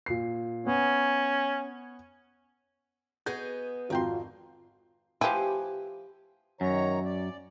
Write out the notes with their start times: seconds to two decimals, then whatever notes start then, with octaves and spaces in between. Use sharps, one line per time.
0.06 A#2 C7
0.66 B3 C#4
3.26 B3 F#4 G#4 D#5 G6
3.90 G#1 F2 F4 F#4 A#4 G5 C6
5.21 F3 E4 G4 B4 C5 G#5
6.61 F#2 D#3 C#5 A#5
7.04 D5